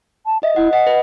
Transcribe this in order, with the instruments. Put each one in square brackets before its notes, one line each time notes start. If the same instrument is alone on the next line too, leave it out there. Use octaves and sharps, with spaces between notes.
[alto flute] A5
[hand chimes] D#5 [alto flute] E5
[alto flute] E4 [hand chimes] F#5
[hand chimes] D#5 [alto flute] F#5
[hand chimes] B4